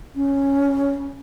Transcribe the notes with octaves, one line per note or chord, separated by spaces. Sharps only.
C#4